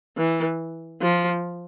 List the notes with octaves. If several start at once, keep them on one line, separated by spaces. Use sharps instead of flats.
E3
F3